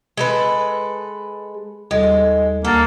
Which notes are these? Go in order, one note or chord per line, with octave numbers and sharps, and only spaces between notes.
G#3 A4 B4
D#2 G3 G#3 A4
D2 A#3 A4 A6